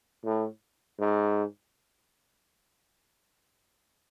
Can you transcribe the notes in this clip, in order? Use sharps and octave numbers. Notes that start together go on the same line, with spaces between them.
A2
G#2